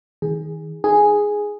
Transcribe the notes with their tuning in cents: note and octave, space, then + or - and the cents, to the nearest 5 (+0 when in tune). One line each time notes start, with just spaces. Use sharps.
D#3 +30 G#4 -10
D#4 +0 G#4 +0